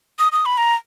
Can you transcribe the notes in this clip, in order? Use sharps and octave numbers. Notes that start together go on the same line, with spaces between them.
D#6
D#6
B5
A#5